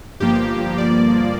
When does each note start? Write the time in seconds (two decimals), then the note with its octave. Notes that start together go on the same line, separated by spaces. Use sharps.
0.20 G1 G2 F3 A#3 G4
0.78 D5